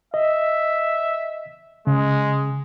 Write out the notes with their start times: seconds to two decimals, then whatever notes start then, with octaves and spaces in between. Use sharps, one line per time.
0.14 D#5 E5
1.87 C#3 G#3